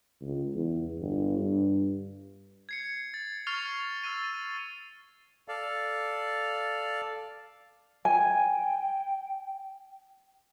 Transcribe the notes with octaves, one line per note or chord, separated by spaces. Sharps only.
C#2
E2
G1
G2
G#6 C7 C#7
A6
C#6 F6 A6 C7 F7
E6 F6 A6 D#7
A4 D5 F5
G5 G#5